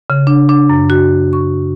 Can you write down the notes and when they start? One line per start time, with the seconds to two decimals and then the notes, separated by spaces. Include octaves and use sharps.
0.10 C#3
0.27 D4
0.49 D4
0.69 F#2
0.90 F#4
1.33 C#6